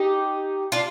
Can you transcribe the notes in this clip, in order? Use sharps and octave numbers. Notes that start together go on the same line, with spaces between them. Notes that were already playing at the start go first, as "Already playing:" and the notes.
Already playing: D#4 G4
D4 F4